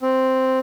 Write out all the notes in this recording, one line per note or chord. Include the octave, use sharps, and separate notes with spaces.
C4